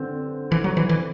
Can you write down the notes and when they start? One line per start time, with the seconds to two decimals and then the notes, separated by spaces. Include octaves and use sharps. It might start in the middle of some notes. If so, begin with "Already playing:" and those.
Already playing: D3 C4
0.52 E3
0.64 F#3
0.77 E3
0.89 E3